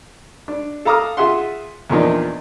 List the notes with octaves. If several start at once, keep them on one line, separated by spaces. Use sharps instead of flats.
D4
A4 F5 A#5 D6 D#6 F6
F4 G#4 E5 F#5 C6
E2 A#2 D#3 F3 D4 D#4